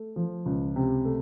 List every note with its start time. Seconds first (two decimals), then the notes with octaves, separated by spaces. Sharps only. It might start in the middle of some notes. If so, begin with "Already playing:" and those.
Already playing: A3
0.16 F3
0.46 C#2
0.76 C3
1.05 A3